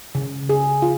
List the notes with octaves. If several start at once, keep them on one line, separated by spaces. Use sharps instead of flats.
C#3
G#4
F4